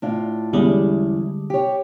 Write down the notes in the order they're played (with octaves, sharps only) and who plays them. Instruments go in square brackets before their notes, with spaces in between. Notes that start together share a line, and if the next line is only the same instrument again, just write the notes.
[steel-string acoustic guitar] A2 D4 F4
[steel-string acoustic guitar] E2 C#4 E4 [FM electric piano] D3 G3 G#3
[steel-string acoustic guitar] G4 C#5